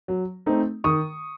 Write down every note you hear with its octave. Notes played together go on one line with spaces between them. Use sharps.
F#3
A3 C4 D#4
D#3 C#6 D#6